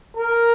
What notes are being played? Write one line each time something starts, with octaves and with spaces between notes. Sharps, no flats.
A#4